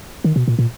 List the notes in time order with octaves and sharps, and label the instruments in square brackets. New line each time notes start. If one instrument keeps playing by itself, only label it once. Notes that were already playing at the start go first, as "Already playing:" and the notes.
[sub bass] D#3
B2
A#2
A#2